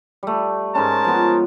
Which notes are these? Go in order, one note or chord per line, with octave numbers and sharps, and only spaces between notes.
G3 A3
G#2 C#4 A#4 C5 A5
F3 B3